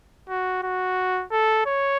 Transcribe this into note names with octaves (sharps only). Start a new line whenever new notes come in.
F#4
F#4
A4
C#5